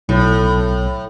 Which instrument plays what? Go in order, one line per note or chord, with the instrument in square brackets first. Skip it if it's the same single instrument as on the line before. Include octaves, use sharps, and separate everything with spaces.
[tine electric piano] B1 [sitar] A2